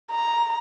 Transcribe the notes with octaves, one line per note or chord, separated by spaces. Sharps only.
A#5